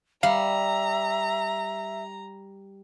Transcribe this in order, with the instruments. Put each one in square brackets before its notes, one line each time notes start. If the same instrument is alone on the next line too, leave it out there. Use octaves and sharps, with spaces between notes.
[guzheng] G3 [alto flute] E5 [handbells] F5 [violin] A#5